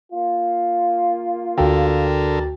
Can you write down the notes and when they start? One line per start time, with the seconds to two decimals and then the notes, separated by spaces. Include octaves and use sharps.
0.13 A#3 F4
1.58 D2 D3 F#4 A4 A#4 G5